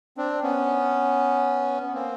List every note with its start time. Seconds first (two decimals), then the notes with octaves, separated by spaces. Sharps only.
0.17 C4 D4
0.42 B3 C#4
1.87 B3
1.94 A#3 C4